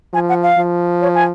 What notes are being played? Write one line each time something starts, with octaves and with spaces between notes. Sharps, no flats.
F3 G#5
F#5
F5
F3
C#5
G#5